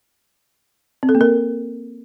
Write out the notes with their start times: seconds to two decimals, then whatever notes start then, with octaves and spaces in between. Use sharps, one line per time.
1.03 C4
1.09 A4
1.15 A#3
1.21 A#4